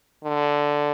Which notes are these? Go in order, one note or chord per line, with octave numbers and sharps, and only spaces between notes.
D3